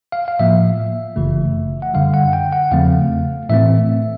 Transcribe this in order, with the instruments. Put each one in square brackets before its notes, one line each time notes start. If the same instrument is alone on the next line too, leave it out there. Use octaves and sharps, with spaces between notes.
[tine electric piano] F5
F5
A2 F3 A#3 E5
G1 F#2 C#3 E3 A3
F#5
F#2 D3 G3 F5
F#5
G5
F#5
E2 C#3 F3 A3 C4 F5
A2 E3 A3 C4 E5